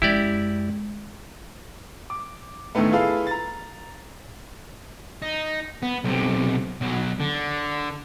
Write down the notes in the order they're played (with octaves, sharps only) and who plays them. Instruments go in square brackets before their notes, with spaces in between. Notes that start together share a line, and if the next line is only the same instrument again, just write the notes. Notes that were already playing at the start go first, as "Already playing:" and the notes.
[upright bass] F#2 G#3 [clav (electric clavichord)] E4 G4 D5
[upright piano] D6
D2 A2 D#3 A3 B3
E4 F4 G#4 A4 B4 F5
A#5 A6
[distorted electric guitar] D#4
B3
B1 C3
B1 F#3
D3